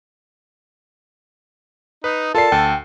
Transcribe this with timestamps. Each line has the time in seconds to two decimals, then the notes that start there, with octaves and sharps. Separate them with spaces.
2.04 D#4 B4
2.35 F4 A4 A#4 D5 A5 C7
2.52 D2 G5